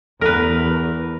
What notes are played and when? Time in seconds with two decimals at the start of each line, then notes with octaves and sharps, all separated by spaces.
0.21 E2 A#4 B4